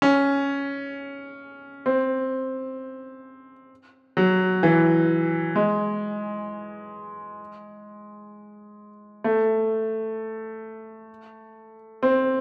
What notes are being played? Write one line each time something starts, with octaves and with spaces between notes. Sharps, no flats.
C#4
C4
F#3
E3
G#3
A3
C4